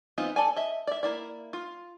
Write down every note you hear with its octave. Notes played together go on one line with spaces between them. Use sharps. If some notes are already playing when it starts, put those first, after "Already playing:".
E3 B3 C4 D#4 F4
A4 D5 G#5
D#5 E5
D5 E5
A#3 E4 D5
F4